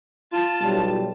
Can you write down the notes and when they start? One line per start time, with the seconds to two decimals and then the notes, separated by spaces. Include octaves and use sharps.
0.33 F4 A5
0.61 B1 G3